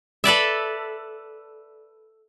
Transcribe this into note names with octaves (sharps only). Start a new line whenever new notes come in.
A4 B4 D5 E5